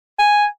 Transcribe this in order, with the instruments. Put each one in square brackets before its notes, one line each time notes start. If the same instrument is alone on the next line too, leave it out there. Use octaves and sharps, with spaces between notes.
[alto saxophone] G#5